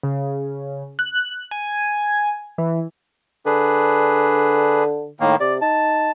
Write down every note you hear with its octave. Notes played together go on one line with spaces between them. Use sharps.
C#3
F#6
G#5
E3
D3 D4 G#4 B4
A2 D#3 A#3
C3 D5
D#4 A5